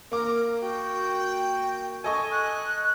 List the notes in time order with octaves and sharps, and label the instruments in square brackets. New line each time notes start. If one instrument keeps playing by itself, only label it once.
[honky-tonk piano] A#3 D6 [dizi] A#4
[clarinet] F#4 [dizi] G5
[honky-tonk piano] A4 D#5 C#6 [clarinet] G#5
[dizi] F#6